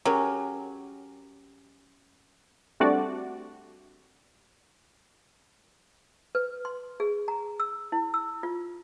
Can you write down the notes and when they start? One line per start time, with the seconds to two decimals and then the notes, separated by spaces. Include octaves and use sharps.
0.05 F#3 C#4 G4 G#4 A#4
2.80 G3 A3 C4 D4 F#4 D5
6.35 B4
6.65 C6
7.00 G#4
7.28 A#5
7.60 E6
7.92 E4
8.14 E6
8.43 F4